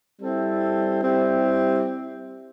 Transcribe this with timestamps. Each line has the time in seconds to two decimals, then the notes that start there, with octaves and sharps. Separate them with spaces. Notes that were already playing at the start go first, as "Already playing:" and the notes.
0.21 G3 C4 E4 A4
1.04 G3 C4 E4 G4